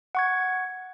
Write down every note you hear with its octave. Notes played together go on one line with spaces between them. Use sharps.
F#5 C#6 G#6